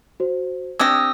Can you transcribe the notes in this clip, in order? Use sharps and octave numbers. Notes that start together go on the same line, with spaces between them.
F#4 C5
C4 D4 G4 D#6 E6 G#6 A#6